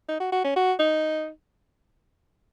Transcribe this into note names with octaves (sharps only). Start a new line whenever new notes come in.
D#4
F#4
F#4
C#4
F#4
D#4